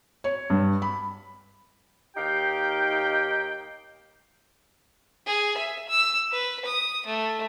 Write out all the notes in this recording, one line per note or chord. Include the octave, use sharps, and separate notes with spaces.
C#5
G2
B5
D#2 D#4 G4 F5 G5
G#4
E5
E6
B4
D#6
A3